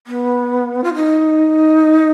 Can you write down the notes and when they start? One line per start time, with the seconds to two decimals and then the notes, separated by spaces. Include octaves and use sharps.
0.07 B3
0.84 F4
0.94 D#4